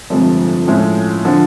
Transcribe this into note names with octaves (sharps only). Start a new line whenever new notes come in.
G1 F2 C3 F3 G#3
A2 F3 G#3 C#4
D3 F3